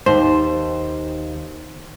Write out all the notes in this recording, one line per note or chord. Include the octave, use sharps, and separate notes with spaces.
D#2 C5